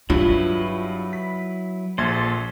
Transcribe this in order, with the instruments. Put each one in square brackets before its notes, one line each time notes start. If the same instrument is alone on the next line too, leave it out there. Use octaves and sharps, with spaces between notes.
[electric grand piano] G2 [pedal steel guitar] F#3 E4 B4 [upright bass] F4
[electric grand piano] B6
[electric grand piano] A#1 C6 G#6 [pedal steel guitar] A4 C5